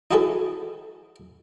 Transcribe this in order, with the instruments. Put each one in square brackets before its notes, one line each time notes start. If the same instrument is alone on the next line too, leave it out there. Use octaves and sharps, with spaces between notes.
[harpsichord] D#4 E4 F#4 G#4 A4 B4